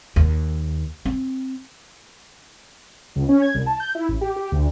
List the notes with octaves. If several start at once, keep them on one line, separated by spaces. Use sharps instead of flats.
D#2
C4
C#2
C#4
G#6
C2
A5
G6
E4
A1
G4
G4
D2